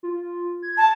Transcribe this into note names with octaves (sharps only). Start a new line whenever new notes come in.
F4
G#6
A5